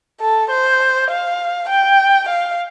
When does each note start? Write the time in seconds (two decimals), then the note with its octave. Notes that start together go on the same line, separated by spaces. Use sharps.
0.21 A4
0.51 C5
1.10 F5
1.70 G5
2.29 F5